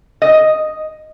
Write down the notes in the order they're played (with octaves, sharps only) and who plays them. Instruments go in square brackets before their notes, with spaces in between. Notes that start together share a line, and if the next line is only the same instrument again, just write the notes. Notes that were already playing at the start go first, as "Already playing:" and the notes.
[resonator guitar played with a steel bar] D#5